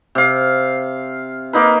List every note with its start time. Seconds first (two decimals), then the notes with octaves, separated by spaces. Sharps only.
0.15 C3 F5
1.53 A#3 D#4 B4